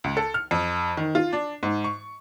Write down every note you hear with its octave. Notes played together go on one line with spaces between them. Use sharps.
C#2
A4
F6
F2
D#3
F4
D4
G#2
C#6